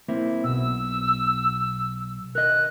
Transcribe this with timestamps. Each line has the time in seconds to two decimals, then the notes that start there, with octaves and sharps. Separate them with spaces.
0.08 A#3 C4 E4
0.44 B1 B2 E6
2.35 A#4 D#5 F#6